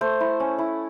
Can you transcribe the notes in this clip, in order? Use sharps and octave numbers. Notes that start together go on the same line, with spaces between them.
A3 C5
E4
C#4
E4